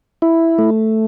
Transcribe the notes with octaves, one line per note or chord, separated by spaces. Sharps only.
E4
A3